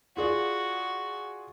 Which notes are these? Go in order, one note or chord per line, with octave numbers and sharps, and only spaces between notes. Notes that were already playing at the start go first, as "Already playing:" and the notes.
F4 F#4 G#4 D5